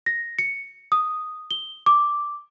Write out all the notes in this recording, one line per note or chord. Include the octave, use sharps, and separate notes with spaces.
A#6
C#7
D#6
G7
D6